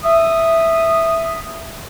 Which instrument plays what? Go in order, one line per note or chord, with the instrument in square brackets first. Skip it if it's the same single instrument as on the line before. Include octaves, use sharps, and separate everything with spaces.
[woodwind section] E5 D#6